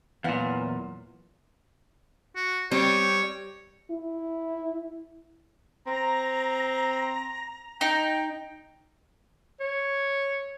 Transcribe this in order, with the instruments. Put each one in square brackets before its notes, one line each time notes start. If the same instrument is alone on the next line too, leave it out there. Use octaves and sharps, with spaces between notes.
[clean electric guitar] E2 A#2 [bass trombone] E3 [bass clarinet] F#3 [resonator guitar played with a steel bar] F5 F#5
[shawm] F#4
[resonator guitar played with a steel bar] G3 C4 [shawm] C#5
[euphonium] E4
[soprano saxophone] C4 [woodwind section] A#5
[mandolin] D#4 [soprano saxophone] G5
[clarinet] C#5